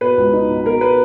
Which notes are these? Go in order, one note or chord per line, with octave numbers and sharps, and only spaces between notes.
B2 B4
C#2
D#4
B2
B2 A#4
B4